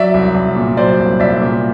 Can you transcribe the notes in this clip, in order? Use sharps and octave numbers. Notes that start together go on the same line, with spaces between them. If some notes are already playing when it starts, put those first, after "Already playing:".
Already playing: F#3 D5 E5
C2
C2
A#2
F#3 C5 D5
C2
C2 D5 E5
A#2